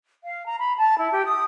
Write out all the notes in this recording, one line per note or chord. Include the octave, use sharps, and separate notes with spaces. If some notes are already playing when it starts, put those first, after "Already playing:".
F5
A#5
B5
A5
E4
G4
D#6